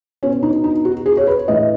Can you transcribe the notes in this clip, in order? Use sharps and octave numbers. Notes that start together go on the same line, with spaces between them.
B2 C#4
D#4
D#4
F#4
G#4
C#5
B4
A2 E3 D#5